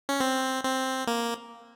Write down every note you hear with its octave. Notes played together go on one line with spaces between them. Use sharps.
C#4
C4
C4
A#3